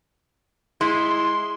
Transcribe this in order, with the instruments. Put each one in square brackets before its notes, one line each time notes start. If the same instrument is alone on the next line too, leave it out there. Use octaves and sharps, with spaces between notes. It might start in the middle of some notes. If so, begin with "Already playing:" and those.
[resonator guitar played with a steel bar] G#3 [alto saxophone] E4 [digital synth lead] C6